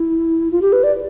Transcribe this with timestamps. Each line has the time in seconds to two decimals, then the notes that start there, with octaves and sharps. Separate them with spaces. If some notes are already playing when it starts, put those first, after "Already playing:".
Already playing: E4
0.51 F4
0.62 G4
0.73 B4
0.84 D5